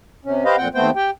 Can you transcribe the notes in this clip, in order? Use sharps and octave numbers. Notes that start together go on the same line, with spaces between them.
C3 C#4
G4 B4 C5 D#5 F5
F2 A#2 C4 F#5 G5
D#2 A3 B3 C4 C5 G5
G4 G5